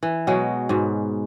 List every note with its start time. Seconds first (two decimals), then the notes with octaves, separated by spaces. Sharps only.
0.03 E3
0.27 B2 F#3 G#3
0.69 G#2 B2